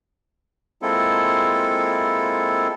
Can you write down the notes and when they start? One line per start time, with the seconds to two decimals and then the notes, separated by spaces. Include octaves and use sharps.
0.82 G#3 A#3 C4 E4 F4 A4